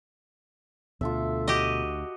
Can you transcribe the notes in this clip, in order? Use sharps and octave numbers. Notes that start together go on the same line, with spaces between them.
D2 B2 F4 A4 E5
F#4 G4 D#5